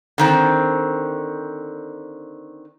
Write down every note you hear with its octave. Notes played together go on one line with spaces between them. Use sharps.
D3 D#3 C4